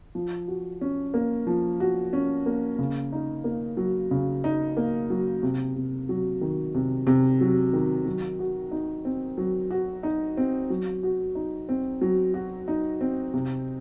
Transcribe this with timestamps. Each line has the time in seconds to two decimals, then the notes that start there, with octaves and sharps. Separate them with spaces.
0.15 F3
0.48 F#4
0.81 C#4
1.14 A#3
1.47 F3
1.80 F#4
2.13 C#4
2.46 A#3
2.79 C#3
3.12 D#4
3.44 A#3
3.77 F#3
4.11 C#3
4.44 D#4
4.77 A#3
5.10 F#3
5.43 C3
5.76 C3
6.09 F#3
6.41 D#3
6.75 C3
7.07 C3
7.41 F#3
7.73 D#3
8.06 F#3
8.39 F#4
8.71 D#4
9.05 C4
9.38 F#3
9.71 F#4
10.03 D#4
10.37 C4
10.70 F#3
11.03 F#4
11.35 D#4
11.69 C4
12.02 F#3
12.34 F#4
12.68 D#4
13.01 C4
13.34 C3